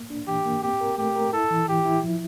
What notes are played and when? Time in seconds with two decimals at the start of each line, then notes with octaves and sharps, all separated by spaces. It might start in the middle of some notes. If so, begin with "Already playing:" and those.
Already playing: A#3
0.10 D4
0.27 E3 G4
0.45 A#3
0.63 C4 G4
0.81 A#4
0.98 A3 G4
1.16 A#4
1.33 E4 A4
1.51 E3
1.68 E3 G4
1.85 E4
2.04 F3